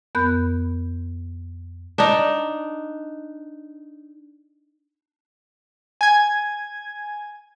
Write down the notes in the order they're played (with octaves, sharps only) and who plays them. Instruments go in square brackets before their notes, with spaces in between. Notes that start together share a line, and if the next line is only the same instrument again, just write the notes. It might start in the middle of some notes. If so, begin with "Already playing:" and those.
[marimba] F2 B3 A#4 B5 F#6 G6
[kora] D4 D#4
[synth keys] G#5 G#6